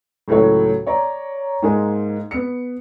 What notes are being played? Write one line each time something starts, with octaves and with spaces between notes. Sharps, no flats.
C#2 A2 F#3 A4 C#5
C#5 D5 A#5
G#2 G#3 A#3 D#4 G#5
B3 C#7